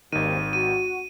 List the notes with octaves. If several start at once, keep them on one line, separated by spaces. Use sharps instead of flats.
G#1 D#2 D#3 C4 D#7
F#4 D#7